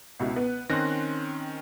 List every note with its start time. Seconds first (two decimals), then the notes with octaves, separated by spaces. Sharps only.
0.20 C#2 B2 E4
0.36 B3 B4
0.70 D#3 C4 C#4 C6 F#6 A#6